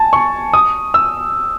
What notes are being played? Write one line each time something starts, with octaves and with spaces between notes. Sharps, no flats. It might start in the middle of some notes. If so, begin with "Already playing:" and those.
Already playing: G#5 A5
C#6
D#6
E6